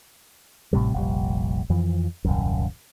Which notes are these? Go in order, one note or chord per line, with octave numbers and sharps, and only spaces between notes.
A1 A2 C3 G3
F1 A#1 G3
F2 E3 F3
D#1 C2 F#2